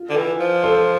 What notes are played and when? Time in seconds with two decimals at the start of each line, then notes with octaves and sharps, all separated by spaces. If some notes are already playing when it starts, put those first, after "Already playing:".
Already playing: F4
0.10 D3
0.17 E3
0.40 F3
0.63 A4 C5